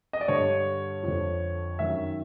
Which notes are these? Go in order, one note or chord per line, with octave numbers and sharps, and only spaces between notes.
D#5
D5
G2 D3 C#5
F2 D3
F#2 D#3 E5